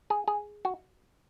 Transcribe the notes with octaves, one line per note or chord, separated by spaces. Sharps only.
G#4
G#4
F#4